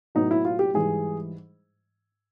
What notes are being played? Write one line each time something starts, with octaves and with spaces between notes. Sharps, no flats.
A2 F#3 B3 D#4
E4
F4
G4
G#2 E3 G3 G#4